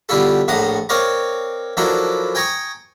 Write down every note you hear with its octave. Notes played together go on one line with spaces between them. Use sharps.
B2 D3 G3 E4 F4 A4
A#1 A2 F5 F#5 A#5 D#6
C4 A#4 C#5 D5 F5 A#5
F3 F#3 D4 E4 A4 A#4
G5 G#5 A#5 C#6 D#6